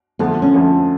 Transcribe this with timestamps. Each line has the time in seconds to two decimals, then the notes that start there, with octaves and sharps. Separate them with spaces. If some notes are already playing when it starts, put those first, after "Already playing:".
0.19 F2 D3 F3 A3 B3
0.42 C#4
0.54 F2 D3 F3 A3